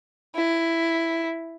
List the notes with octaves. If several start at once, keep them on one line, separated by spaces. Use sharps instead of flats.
E4